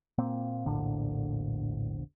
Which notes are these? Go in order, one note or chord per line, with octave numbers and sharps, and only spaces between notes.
A#2 A#3 C4
E1 A#1 A2 D3